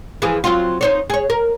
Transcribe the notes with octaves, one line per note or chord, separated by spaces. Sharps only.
E3 F3 G#4
F#3 C4 F4
D#4 C5 C#5
G#4 C#5
A#4